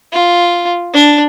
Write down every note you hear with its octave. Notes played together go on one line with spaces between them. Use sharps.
F4
D4